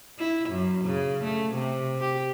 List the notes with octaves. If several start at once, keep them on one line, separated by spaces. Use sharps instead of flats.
E4
F#2
C#3
A3
C3
G4